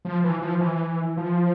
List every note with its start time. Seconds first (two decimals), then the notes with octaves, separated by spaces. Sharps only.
0.05 F3
0.24 E3
0.41 F3
0.60 E3
1.17 F3